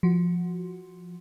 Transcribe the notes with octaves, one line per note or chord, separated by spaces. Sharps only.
F3 F#4